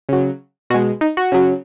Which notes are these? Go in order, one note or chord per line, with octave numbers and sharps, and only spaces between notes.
C#3 F#3
B2 G#3 F#4
D#4
F#4
C#3 F#3